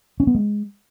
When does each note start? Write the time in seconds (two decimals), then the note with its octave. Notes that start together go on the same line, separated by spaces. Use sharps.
0.20 C#4
0.27 B3
0.35 G#3